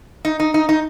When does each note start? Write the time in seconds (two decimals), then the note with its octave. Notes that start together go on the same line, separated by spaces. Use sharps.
0.25 D#4
0.40 D#4
0.54 D#4
0.69 D#4